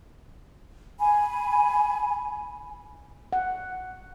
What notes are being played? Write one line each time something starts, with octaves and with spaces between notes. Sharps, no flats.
G#5 B5
F#5